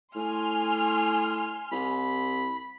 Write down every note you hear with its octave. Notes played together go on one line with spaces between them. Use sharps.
A2 G#5 C6 F6
C2 B5